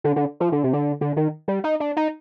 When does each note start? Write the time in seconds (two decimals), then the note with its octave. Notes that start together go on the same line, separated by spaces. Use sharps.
0.04 D3
0.16 D3
0.40 F3
0.52 D3
0.64 C3
0.73 D3
1.01 D3
1.16 D#3
1.48 G3
1.64 D#4
1.80 D4
1.97 D#4